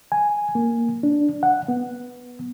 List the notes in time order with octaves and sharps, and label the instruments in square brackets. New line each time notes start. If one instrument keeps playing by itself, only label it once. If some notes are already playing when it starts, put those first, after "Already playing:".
[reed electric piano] G#5
A#3
D4
F#5
B3